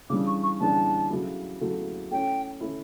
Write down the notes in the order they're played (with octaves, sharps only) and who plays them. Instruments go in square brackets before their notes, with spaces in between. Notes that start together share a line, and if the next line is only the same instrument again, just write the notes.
[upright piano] C#3 E3 G3 D4 [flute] D6
[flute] C#6
C#6
[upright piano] C#3 E3 G3 D4 [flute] A5
[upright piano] C#3 F#3 A3 E4
C#3 F#3 A3 E4
[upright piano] A3 C#4 E4 [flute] G5
[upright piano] A3 C#4 E4